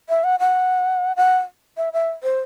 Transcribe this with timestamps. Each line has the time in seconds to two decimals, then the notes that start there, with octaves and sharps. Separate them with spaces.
0.09 E5
0.24 F#5
0.40 F#5
1.16 F#5
1.77 E5
1.93 E5
2.23 C5